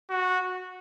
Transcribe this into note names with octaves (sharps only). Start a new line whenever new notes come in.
F#4